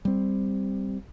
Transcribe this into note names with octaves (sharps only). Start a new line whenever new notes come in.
G3 C4